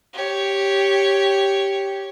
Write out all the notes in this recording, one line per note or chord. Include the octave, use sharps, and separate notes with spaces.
G4 C#5